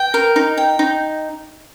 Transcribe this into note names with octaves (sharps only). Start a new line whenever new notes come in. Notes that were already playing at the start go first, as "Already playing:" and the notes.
Already playing: G5
A#4
D#4
G5
D#4